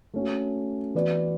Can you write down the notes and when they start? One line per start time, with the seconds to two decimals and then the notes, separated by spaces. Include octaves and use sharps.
0.14 A3 C#4 F#4
0.95 E3 B3 F#4 B4 D5